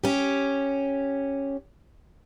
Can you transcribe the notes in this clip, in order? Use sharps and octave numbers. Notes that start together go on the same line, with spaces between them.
C#4 G4